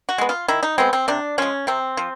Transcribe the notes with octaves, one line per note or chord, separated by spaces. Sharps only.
F#4
G#3 B3
F4
D#3 E4
D#4
G#3 B3 C4
C4
C3 D4
F3 G#3 C#4
C3 C4
F3